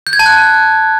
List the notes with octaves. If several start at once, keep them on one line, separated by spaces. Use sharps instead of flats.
G6
G#6
A5
F#6